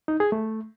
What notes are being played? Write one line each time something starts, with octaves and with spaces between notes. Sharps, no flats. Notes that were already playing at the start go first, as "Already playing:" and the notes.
D#4
G#4
A3